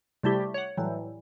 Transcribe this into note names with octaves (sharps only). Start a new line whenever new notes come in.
C3 G3 A3 E4 G4
C#5 F#5
A2 E3 F#3 G3